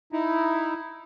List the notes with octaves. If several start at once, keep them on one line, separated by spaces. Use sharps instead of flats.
D#4 E4